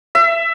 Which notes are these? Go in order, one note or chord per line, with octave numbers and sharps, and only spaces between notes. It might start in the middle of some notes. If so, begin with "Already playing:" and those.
E5